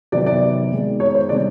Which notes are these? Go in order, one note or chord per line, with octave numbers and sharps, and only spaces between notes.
C3 D#3 F#3 B3 D5
D5
D#3 G#3 B3
C#5
C5
C3 D#3 G3 C4 D5